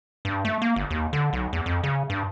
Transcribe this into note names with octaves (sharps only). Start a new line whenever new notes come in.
G2
A3
A#3
G1
D#2
D3
B1
E2
F2
C#3
G2